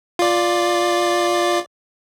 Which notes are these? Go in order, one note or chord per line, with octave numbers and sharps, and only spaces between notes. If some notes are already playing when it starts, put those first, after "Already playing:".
F4 D5